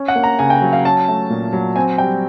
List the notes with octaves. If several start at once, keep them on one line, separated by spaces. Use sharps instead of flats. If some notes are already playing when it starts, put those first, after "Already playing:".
Already playing: C#4
F#5
A#3
A#5
C#3 G#5
G5
F#3
F5
C#4 A5
A3
A#2
F#3
C4 G#5
G3 G5